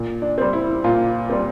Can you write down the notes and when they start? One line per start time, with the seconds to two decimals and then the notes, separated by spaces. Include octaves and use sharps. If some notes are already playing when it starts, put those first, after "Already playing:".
Already playing: A#2
0.22 D4
0.38 G3 C4
0.53 E4
0.84 A#2 F4
1.30 G3 C4